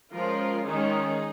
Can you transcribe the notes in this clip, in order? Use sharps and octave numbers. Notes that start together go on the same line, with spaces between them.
F3 G#3 C#4 F4 A#4
D#3 G#3 C#4 D#4 G#4